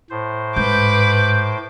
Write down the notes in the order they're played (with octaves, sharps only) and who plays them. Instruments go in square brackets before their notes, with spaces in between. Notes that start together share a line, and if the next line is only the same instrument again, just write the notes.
[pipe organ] A2 C5
[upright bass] G#2 [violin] B4 D6 [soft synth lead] G6